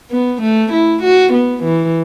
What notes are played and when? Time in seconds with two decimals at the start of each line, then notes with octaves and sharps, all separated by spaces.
0.11 B3
0.42 A3
0.73 E4
1.03 F#4
1.34 B3
1.64 E3